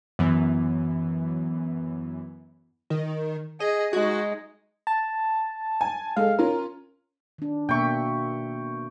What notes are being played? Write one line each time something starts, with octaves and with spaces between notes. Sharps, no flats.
F#2 E3 B3
D#3
G#4 D#5
G#3 D#4 F#4
A5
G#5
G#3 A4 F5
C#4 F4 A#4
D#3 D4
B2 A#3 E5 G5 C#6